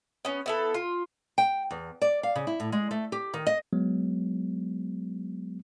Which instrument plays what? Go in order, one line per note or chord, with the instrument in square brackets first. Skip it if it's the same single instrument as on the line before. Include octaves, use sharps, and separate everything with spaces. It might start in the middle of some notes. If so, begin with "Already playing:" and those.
[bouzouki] B3 C#4
B3 E4 A4
F4
[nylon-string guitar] G5
E2
D5
F5
C#3
E4
A2
G#3
A3
G4
D#3
D#5
[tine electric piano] F#3 G#3 B3